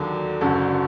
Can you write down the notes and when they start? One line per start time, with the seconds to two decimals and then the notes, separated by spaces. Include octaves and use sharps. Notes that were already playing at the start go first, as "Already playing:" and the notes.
Already playing: D#2 D3 F#3
0.41 F#1 F#2 D3 F#3 F#4 A4